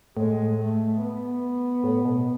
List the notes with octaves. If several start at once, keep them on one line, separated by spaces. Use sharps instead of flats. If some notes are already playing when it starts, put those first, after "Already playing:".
A2 G#3
A3
B3
A2
B2